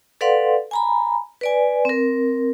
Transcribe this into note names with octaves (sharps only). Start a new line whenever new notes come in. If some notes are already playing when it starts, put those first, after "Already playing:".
A4 B4 D5 F5 F#5 C6
G#5 A#5 B5
B4 D5 G#5
C4 A#4